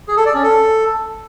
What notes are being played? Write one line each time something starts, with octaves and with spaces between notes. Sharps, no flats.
G#4
A4
D5
C#4
A4